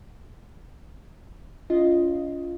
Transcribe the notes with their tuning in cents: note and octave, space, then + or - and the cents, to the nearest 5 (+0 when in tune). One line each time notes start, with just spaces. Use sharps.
C#4 +35 F4 -10 D#5 +5